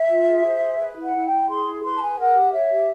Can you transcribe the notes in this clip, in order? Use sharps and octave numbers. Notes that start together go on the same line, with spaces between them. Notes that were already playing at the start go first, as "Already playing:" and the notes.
Already playing: E5
F4
G#4
C5
G#4
B4
E4
F#5
E4
G5
E4
G#4 C6
E4
B4 C6
A5
G#4 G#5
A#4 F#5
G4
C#5 E5
G4